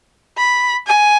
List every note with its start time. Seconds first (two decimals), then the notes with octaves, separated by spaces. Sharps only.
0.38 B5
0.87 G#5